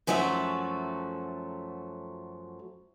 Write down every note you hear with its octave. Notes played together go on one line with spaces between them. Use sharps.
F#2 F3 F#3 A3 F#4 E5